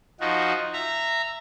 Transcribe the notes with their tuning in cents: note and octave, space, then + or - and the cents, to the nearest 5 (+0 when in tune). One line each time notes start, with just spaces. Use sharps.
F3 +0 D#4 +0 F#4 +0
E5 +10 A#5 -15